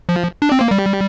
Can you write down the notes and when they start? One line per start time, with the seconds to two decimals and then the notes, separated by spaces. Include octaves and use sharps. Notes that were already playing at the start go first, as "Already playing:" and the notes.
0.09 F3
0.42 D4
0.52 C4
0.61 A#3
0.71 G3